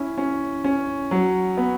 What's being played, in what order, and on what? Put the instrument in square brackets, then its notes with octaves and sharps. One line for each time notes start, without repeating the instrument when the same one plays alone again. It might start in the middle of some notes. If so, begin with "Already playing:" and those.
Already playing: [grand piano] C#4 E4
C#4
C#4
F#3
B3